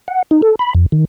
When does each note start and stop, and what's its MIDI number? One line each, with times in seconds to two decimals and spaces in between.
0.08 0.23 78
0.31 0.41 63
0.42 0.55 69
0.59 0.73 83
0.75 0.86 41
0.92 1.05 51